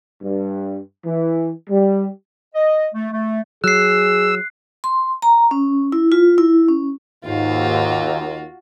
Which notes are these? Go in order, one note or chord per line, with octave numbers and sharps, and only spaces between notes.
G2
E3
G3
D#5
A3
A3
F#3 G#4 E6 F#6 C7
C6
A#5
C#4
E4
F4
E4
C#4
D#2 G#2 F4 F#4